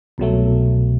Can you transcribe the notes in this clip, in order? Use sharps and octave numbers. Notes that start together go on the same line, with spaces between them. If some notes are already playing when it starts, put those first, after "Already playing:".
C2 B2 F#3 A3